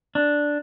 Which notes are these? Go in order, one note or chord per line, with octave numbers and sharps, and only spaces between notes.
D4